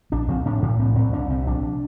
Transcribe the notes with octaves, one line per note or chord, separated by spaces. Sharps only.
A#1 D4
A#1 C4
A2 D4
A2
C2 C4
C2 C4
C2 D4
C3 C4
A#1 D4